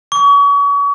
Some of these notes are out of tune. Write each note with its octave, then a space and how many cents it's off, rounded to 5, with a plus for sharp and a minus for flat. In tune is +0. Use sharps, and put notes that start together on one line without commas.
C#6 +35